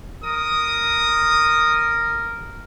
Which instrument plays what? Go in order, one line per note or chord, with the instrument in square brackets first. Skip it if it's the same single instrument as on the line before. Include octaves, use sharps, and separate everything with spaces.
[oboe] A#4 [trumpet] D#6